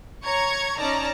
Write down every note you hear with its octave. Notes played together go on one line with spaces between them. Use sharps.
C#5 A#5 C#6 G#6
C#4 D#4 D5 A5 A#5